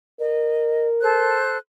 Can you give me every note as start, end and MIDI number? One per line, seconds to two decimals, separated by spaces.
0.20 1.42 70
0.20 0.87 75
1.01 1.57 69
1.01 1.57 72
1.01 1.57 90